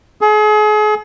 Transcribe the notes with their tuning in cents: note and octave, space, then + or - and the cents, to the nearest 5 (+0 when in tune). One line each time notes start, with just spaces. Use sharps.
G#4 +35